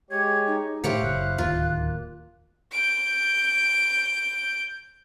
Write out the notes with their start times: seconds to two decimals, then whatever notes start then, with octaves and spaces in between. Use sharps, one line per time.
0.11 G#3 G4 C#5 G#6
0.47 D#4
0.84 A2 E4 G4 C5 C#5 F5 F#5
1.02 F#1 F#6
1.38 D1 D#2 F4
1.62 A#3
2.72 G6 D7